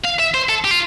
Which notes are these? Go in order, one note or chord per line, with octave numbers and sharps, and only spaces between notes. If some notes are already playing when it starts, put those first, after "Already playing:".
F5
E5
C5
A4
G4
F4